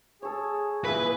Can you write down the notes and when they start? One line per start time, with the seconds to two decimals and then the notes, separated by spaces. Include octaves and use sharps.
0.22 G#4 A4 C#5
0.84 A#2 E4 G#4 B4